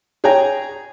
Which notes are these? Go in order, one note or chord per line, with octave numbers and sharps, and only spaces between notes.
G#4 C#5 G5 G#5 A#5